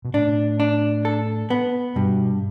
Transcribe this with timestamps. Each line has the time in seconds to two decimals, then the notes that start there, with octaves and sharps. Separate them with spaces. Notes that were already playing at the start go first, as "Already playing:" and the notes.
0.05 B2
0.13 A2 D4
0.60 D4
1.05 A4
1.50 B3
1.96 G2 B2